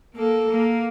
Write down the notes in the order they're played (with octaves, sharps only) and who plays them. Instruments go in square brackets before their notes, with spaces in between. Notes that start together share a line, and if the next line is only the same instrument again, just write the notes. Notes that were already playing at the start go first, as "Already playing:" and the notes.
[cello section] A#3 [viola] A4
[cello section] A#3